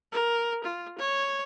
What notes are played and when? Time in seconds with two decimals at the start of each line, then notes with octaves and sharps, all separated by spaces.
0.12 A#4
0.64 F4
0.99 C#5